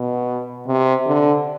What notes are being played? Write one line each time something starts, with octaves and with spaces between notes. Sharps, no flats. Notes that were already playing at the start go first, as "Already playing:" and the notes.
Already playing: B2
C3
D3